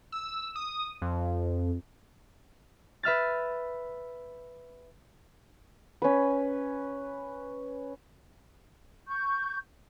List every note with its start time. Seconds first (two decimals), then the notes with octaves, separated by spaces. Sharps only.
0.12 E6
0.56 D#6
1.02 F2
3.03 B4 E5 F6 A6
6.02 C#4 B4
9.08 C#6 G6